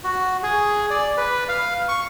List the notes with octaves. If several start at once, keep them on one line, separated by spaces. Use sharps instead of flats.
F#4
G#4
D5
B4
F5
C#6